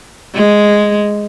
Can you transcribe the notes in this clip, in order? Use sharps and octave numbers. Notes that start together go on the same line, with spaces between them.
G#3